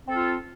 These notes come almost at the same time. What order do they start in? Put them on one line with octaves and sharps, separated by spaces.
C4 A4 F4